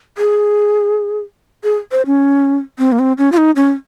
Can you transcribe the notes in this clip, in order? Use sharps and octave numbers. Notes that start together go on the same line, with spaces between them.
G#4
G#4
C5
C#4
C4
A#3
C4
C#4
F4
D#4
C#4